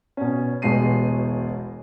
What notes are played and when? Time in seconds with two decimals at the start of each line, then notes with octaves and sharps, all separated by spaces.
0.17 B2 C#4
0.62 E1 A1 B2 G#3 C7 D#7